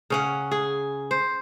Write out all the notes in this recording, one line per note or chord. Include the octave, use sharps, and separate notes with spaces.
C#3 C#4 F#5
G#4
C5